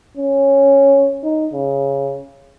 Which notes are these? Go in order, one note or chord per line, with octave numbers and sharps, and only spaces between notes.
C#4
D#4
C#3